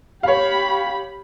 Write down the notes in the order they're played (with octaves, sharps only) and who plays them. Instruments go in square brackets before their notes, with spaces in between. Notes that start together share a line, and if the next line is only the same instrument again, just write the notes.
[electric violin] G4 B5 [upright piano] C#5 F5